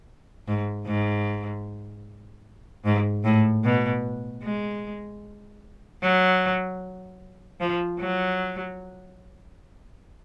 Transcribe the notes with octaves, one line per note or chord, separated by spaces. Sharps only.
G#2
G#2
G#2
A2
B2
G#3
F#3
F3
F#3